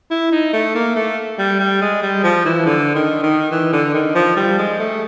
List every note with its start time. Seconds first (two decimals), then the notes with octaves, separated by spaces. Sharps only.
0.10 E4
0.31 D#4
0.53 A3
0.75 A#3
0.96 A3
1.39 G3
1.60 G3
1.81 G#3
2.02 G3
2.23 F3
2.45 E3
2.66 D3
2.95 D#3
3.23 D#3
3.52 E3
3.73 D3
3.94 D#3
4.15 F3
4.37 G3
4.58 G#3
4.79 A3